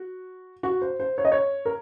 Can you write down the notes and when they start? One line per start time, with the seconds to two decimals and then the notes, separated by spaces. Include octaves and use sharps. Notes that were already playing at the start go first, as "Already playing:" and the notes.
Already playing: F#4
0.63 F#4
0.82 C5
1.00 C5
1.18 C#5
1.25 D#5
1.32 C#5
1.65 A#4